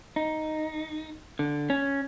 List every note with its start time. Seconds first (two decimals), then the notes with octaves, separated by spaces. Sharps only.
0.16 D#4
1.39 D3
1.70 C#4